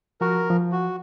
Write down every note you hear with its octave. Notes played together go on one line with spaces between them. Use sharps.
F3 F#4 A#4 C#6
F3
F#4